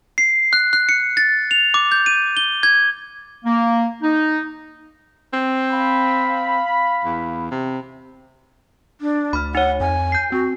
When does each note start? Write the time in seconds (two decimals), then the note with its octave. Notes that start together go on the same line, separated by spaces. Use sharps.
0.18 C7
0.53 F#6
0.73 F#6
0.89 C#7
1.17 A6
1.51 F7
1.74 D6
1.92 G6
2.06 D#7
2.37 G7
2.63 G#6
3.45 A#3
4.02 D#4
5.33 C4
5.72 F5 B5
7.05 E2
7.51 C3
9.01 D4
9.33 D2 B5 F6
9.55 D#4 C#5 F#5
9.80 F2 G#5
10.12 G6 C7
10.32 C4 F#4